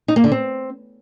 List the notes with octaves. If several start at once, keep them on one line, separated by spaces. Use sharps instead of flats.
D#4
A#3
D3
C4